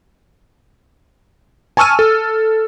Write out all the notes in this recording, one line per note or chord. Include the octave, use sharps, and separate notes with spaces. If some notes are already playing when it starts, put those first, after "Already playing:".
G#5 A5 C#6 E6 F6 D#7
A4